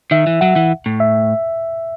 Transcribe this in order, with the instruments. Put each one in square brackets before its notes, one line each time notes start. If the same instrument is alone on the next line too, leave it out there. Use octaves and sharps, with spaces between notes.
[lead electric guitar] D#3 [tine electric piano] E5
[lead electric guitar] E3
[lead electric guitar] F#3 [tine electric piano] F#5
[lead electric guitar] E3
A2
[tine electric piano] E5